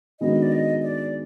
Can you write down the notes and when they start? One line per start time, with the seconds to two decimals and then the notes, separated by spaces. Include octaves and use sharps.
0.20 D#3 G#3 B3 D4 F#4 D#5
0.42 D5
0.52 D#5
0.83 D5